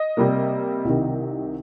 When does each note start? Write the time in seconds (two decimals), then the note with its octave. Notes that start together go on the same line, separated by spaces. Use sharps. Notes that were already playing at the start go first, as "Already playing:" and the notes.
Already playing: D#5
0.17 C3 G3 A#3
0.85 C2 C3 D#3